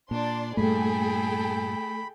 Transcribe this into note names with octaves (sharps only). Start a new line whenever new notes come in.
A#2 D4 D5 C6
G2 A#2 A3 G#4 A4 G5 B5